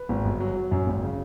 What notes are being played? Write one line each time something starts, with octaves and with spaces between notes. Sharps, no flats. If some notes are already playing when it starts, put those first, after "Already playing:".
Already playing: B4
G#1
G1
F#3
F#3
F#2
G#1
C#3